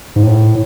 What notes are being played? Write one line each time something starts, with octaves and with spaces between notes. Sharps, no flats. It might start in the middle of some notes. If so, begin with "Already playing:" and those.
G#2
A2